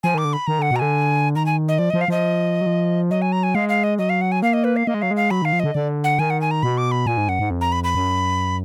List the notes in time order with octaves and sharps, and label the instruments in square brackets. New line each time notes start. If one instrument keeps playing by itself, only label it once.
[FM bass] F3 [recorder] G#5
[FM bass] D#3 [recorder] D6
[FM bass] D3
[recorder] B5
[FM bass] D#3 [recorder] A#5
[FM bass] D3 [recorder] F#5
[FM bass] B2
[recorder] A#5
[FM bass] D3 [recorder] G#5
[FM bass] D#3 [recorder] A#5
[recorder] G#5
D#5
[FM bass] F3 [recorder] D5
[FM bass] F3 [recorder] D#5
[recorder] F5
[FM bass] F3 [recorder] D#5
[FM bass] F#3
F3
[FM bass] F#3 [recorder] D#5
[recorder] G#5
A#5
G#5
[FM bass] G#3 [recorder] F5
[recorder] F5
D#5
[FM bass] F#3 [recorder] D#5
[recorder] F5
F#5
G#5
[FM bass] A#3 [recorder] F5
[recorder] D#5
B4
F5
[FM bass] A#3 [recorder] D#5
[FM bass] G#3
[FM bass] F#3 [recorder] F5
[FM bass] G#3
[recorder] F5
[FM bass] F#3 [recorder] B5
[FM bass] D#3 [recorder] F5
[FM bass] F3
[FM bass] D3 [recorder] D#5
[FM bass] D3 [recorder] D5
[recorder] F#5
[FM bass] D#3 [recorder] G#5
[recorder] F#5
G#5
A#5
[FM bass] B2 [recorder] B5
[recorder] D6
B5
[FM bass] A#2 [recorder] G#5
[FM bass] G#2
[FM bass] F#2 [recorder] F#5
[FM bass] G#2
F2
[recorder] A#5
B5
B5
[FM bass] F#2